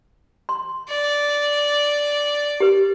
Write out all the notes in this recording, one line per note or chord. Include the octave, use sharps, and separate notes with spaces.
C6
D5
G4 B4